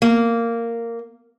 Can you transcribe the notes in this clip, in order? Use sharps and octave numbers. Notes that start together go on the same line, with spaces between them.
A#3